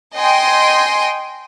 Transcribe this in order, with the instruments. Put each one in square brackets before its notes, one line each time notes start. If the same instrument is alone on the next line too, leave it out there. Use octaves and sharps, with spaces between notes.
[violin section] D#5 G5 G#5 C6